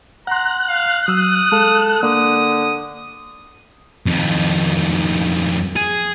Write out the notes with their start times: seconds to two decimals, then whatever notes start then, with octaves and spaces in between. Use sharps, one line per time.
0.27 F#5 A#5 C6 F#6
0.69 F5
1.08 F#3 D#6 E6
1.52 G#3 A4 F5
2.03 D3 A#3 D#6
4.06 F2 D#3
5.76 G#4